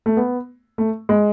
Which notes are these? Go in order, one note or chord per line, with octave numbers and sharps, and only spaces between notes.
A3
B3
A3
G#3